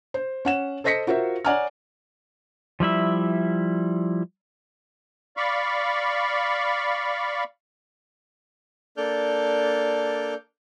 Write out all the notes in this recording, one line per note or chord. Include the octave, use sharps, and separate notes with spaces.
C5
C#4 F#5 E7
A4 C5 D#5 A#6 B6 C#7
F4 F#4 A#4 C5 E5
C#5 D5 F#5 G#5 A#5 F6
F3 G3 E4 E5
D5 F5 B5 C#6
A#3 D4 A4 D5 F6 G6